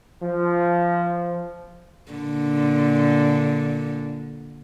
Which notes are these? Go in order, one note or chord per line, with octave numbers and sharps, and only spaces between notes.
F3
A#2 D3